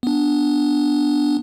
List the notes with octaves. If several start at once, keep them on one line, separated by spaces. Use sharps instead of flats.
B3 D4